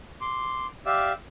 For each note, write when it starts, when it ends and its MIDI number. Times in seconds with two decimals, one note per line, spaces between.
0.21 0.67 84
0.21 0.67 86
0.86 1.13 67
0.86 1.13 74
0.86 1.13 76
0.86 1.13 77
0.86 1.13 88